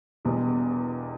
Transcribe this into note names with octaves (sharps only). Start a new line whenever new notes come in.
E1 E2 B2 G3